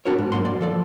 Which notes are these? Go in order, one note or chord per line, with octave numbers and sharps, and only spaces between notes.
B3 C4 D4 F#4 A#4 C#5
G#2
F#2 A#3 F#4 C6
D5
F3 A4 D5